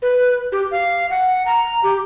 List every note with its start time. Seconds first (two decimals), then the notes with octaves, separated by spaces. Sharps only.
0.02 B4
0.52 G4
0.71 F5
1.10 F#5
1.46 A#5
1.83 G4